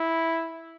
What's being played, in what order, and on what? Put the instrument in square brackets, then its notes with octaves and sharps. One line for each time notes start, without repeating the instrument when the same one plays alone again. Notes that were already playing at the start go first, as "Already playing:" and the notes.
Already playing: [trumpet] E4